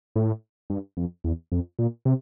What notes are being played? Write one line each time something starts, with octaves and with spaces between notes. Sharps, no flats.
A2
G2
F2
E2
F2
A#2
C3